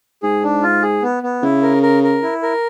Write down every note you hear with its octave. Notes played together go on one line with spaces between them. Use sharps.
G#2 G#4
D4
F4
G#4
B3
B3
C#3 E4
A#4
A#4
A#4
E4
A#4